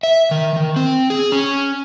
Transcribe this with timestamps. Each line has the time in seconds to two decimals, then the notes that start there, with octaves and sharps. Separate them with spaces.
0.03 E5
0.31 D#3
0.56 D#3
0.76 C4
1.10 G#4
1.32 C#4